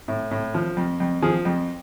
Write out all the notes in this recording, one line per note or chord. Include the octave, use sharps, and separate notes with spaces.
A2
A2
F3
F2
F2
F3 G#4
F2